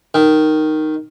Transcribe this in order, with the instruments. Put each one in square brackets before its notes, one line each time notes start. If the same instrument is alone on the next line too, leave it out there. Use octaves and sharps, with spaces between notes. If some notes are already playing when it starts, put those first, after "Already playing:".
[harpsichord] D#3